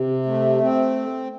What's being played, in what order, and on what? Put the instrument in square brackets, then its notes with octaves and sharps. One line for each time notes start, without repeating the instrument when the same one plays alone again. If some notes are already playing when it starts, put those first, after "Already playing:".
Already playing: [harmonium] C3
A3
C4